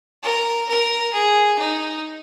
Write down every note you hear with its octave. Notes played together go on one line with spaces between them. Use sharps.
A#4
A#4
G#4
D#4